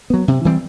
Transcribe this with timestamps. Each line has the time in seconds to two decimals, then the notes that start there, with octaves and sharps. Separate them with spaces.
0.10 F#3 B3
0.28 C3
0.45 E3 G3 C4